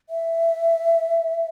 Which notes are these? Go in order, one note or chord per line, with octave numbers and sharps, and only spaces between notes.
E5